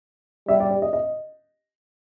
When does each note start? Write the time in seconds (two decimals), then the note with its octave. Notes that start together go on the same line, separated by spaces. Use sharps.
0.48 G3 E5
0.60 D5
0.70 D5
0.82 D#5
0.93 D#5